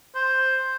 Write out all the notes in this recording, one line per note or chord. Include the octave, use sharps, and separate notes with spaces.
C5